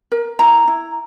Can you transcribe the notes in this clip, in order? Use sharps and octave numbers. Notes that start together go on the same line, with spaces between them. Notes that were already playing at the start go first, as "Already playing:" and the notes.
A#4
E4 A#5
E4